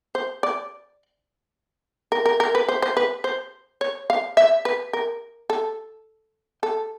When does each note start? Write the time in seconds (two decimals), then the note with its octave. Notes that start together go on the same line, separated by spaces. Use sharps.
0.15 C5
0.43 D5
2.12 A#4
2.26 A#4
2.40 A#4
2.55 B4
2.69 C5
2.82 C5
2.97 B4
3.24 C5
3.81 C#5
4.10 F5
4.37 E5
4.65 B4
4.93 A#4
5.50 A4
6.63 A4